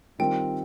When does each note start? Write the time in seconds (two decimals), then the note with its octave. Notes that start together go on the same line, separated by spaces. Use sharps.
0.19 D#3 G3 C4 F4 A#4 G5